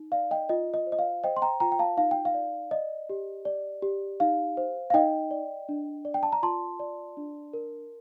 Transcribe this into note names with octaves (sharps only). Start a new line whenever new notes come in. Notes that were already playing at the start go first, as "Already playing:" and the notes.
Already playing: D#4
D5 F5
D#5 G5
F4 D#5
D#5
C5
D#5
F5
C5 D#5 G5
C6
G5 A#5
F4 G5 A#5
G5
F5 A5
D#4 F5
G5
F5
D5
D5 D#5
G4
D5
G4
D#4 F5
C5
F5
D#4 D#5 G5
D5
D4
D5
G5
A5
A#5
F4 A5 C6
D5
D4
A#4